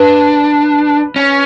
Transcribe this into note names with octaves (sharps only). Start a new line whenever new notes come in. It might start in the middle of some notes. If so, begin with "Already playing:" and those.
Already playing: D4 B4
C#4